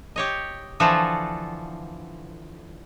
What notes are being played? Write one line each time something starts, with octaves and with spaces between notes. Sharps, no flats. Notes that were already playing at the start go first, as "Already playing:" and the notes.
G4 C#5 D#5
D3 E3 F3 F4 F#4 A4